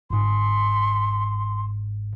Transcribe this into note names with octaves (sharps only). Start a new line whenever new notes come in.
G1 G#2 C6